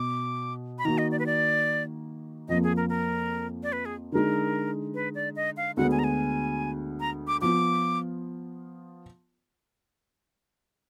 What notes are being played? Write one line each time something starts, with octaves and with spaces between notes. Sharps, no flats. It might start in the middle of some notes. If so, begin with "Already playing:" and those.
Already playing: B2 B3 D6
B5
D#3 A#3 D#4 F#4 A#5
D#5
D5
B4
D5
F2 F3 A#3 D#5
G#4
A#4
A#4
D5
B4
G#4
D3 G#3 D#4 A#4
B4
D5
D#5
F5
D2 D3 G#3 B3 F#5
G#5
A#5
G#5
A#5
D6
F3 B3 F4 D6